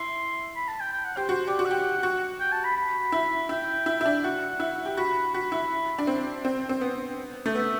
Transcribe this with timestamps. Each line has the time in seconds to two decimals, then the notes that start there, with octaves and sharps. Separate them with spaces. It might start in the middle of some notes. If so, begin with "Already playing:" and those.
Already playing: E4 C6
0.55 B5
0.68 A5
0.80 G5
0.92 G5
1.05 F#5
1.17 G4 C5
1.29 F#4 C5
1.47 G4 D5
1.59 F#4
1.65 F#5
1.71 G4
2.03 F#4
2.40 G5
2.52 A5
2.64 B5
2.77 B5
3.12 E4
3.49 E4 G5
3.86 E4
4.01 E4
4.06 D4
4.23 F#4 F#5
4.60 E4
4.86 G4
4.97 F#4 B5
5.34 F#4 B5
5.52 E4
5.99 D4
6.07 C4
6.45 C4
6.69 C4
6.81 B3
7.46 A3
7.55 B3 E5